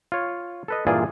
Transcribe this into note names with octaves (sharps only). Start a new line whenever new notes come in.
F4 C#5
A4 B4 D#5
G2 A#2 E3 F4 G#4 D5